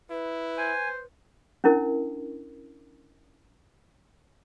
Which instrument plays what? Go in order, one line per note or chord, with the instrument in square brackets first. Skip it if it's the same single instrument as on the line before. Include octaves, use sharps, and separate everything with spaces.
[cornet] E4 [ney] B4
[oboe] C5 [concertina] G#5
[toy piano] C#4 D4 E4 A#4